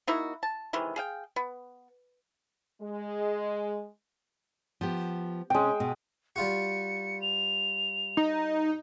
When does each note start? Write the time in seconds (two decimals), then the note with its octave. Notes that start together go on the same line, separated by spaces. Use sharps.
0.07 A#3 D#4 E4 F#4
0.43 A5
0.73 C3 D#3 E3 G#3
0.96 G#4 F5 G5
1.36 B3
2.82 G#3
4.81 F3 B3 G4
5.50 C3 G#3 C#4 G5
5.80 B2
6.36 G3 F4 F#4 C#7
7.22 F7
8.17 D#4